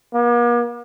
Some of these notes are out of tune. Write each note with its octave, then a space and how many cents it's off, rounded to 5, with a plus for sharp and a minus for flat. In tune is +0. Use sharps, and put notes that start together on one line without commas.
A#3 +45